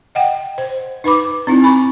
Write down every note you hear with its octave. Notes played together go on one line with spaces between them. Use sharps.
D#5 F#5 G5
C5
D#4 B4 B5 D6
C4 D#4 E4
G#5 B5 C#6